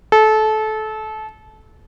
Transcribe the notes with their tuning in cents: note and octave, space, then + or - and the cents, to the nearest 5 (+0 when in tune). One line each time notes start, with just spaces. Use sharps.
A4 -25